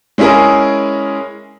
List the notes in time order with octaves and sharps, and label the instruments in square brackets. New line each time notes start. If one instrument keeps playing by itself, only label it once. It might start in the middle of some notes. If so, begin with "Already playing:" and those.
[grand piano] G#3 C#4 E4 G#4 A#4